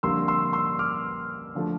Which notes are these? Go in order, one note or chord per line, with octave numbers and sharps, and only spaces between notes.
F2 D3 G3 A#3 C6 E6
C6 E6
C6 E6
D6 F6
D3 F3 A3